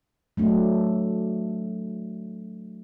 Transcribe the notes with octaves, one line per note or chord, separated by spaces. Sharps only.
F#3 A3 D4